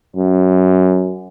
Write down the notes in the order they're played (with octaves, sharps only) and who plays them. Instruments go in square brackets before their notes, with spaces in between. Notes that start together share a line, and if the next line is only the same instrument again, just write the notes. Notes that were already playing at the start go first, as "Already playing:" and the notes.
[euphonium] F#2